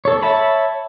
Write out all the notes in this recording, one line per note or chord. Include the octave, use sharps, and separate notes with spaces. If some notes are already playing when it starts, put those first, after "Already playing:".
A4 C#5
C#5 E5 A5 B5